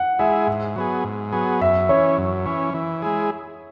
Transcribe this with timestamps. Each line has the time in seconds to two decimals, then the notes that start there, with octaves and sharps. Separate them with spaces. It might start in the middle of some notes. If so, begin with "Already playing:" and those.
Already playing: F#5
0.19 G#3 E4 G#4 E5
0.47 G#2
0.76 F#3 B3 G#4
1.04 G#2
1.32 F#3 B3 G#4
1.61 F#2 E5
1.89 E3 C#4 C#5
2.18 F#2
2.46 E3 C#4
2.74 E3
3.02 G#3 E4 G#4